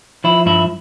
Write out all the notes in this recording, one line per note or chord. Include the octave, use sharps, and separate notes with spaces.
F3 E4
G2 E4